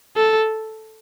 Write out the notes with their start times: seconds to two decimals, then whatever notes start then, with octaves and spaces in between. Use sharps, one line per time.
0.17 A4